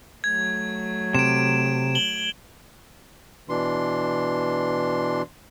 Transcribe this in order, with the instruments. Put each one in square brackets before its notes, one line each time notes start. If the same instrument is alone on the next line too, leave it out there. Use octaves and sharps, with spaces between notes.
[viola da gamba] F#3 A3 [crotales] G#6
[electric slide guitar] C3 [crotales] D7 E7
[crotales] F#7 G7
[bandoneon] B2 E3 D4 C6